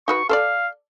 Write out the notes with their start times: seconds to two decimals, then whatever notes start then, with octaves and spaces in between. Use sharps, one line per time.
0.08 D#4 F#4 B4 C#6
0.29 A4 C5 D5 F5